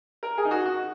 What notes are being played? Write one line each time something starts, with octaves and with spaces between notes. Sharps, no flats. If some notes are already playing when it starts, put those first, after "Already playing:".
A#4
G#4
D#4
F#4
F#4